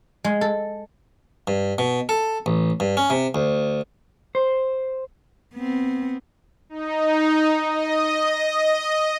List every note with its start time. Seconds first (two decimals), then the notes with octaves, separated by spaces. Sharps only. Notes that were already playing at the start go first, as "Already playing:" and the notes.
0.24 G#3
0.41 A4
1.47 G2
1.78 B2
2.09 A4
2.46 A1
2.80 G2
2.97 C#4
3.10 C3
3.35 D2
4.35 C5
5.55 B3 C4
6.69 D#4
7.57 D#5